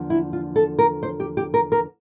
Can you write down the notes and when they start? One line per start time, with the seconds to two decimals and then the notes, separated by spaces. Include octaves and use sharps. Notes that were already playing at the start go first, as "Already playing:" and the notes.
Already playing: E2 D3 F3 A#3 D4
0.10 E4
0.33 F4
0.56 A4
0.79 A#4
1.03 C5
1.20 G4
1.37 G4
1.54 A#4
1.72 A#4